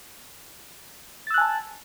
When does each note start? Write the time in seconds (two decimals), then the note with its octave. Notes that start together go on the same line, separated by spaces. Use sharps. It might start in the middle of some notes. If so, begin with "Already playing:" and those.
1.27 A6
1.30 E6
1.34 F#6
1.38 G#5
1.41 A5